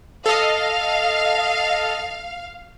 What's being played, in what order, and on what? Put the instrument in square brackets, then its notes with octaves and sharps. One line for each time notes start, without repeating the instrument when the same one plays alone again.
[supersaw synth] A4 D#5 [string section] F5